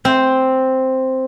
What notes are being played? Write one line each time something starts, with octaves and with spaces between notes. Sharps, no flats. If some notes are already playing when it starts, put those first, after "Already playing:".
C4